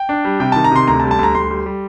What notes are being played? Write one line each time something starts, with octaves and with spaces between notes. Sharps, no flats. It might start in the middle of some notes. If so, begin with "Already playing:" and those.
Already playing: G5
D4
G3
C3 G5
D#3 A5
A#5
C3 C6
D2 A#5
A5
G3
A5
D2 A#5
D2 C6
G3
G3